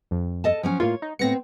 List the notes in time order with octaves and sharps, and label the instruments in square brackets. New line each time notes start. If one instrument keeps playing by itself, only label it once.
[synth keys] F2
[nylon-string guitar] A4 D#5 A5
F3 F#3 C#4
[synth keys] A2 A#3 F4 [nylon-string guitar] C#5
[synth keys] D#4
[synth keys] A2 A#6 C#7 [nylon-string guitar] B3 C4